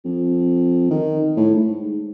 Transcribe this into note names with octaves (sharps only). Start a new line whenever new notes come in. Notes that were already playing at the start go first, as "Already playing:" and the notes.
F2
D#3
A2
G#2